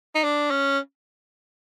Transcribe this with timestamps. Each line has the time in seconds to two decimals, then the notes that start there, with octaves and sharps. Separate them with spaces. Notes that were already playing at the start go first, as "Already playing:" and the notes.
0.15 D#4
0.24 D4
0.51 C#4